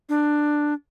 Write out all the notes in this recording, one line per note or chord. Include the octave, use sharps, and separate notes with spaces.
D4